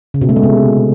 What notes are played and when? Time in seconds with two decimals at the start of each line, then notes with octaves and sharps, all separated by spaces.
0.14 C#3
0.21 B2
0.29 A3
0.36 G#3
0.43 C3